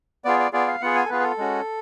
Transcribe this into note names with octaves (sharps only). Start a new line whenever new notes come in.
B3 F4 G#4 D5
D5
B3 F4 G#4 D5
F5
B3 F4 G#4 F#5
G#5
A4
B3 F4 G#4 B4
G#4
A4
G#3 C#4 F#4